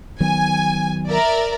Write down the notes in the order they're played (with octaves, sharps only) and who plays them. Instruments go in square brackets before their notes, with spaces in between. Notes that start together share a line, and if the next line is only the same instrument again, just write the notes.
[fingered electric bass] D#3 F#3 B3 [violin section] G#5
[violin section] A#4 D5 E5